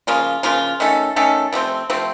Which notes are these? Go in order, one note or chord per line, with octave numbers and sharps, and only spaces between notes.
C#3 F3 A#3 F4
C#3 F3 A#3 F4
D#3 A3 C#4 A4
D#3 A3 C#4 A4
C3 F3 A3 C4
C3 F3 A3 C4